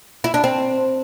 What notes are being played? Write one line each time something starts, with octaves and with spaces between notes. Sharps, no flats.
E4
D4
C4